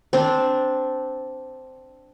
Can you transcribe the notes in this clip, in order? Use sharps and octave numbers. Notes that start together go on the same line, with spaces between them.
C4 D4